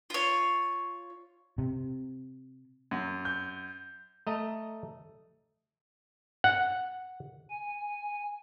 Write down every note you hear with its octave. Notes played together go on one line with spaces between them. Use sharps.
F4 C#5
C3
F#2
G6
A3 D#5 A#5
F#5
G#5